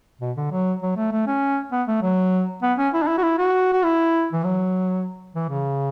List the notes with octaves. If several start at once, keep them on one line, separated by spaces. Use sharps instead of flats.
B2
D3
F#3
F#3
A3
A3
C#4
B3
A3
F#3
B3
C#4
E4
D4
E4
F#4
E4
F#4
F#4
E4
E3
F#3
E3
C#3